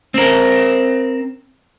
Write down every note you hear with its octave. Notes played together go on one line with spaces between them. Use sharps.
C4 A#4